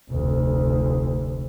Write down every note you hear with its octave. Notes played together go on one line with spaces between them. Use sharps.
F1 D2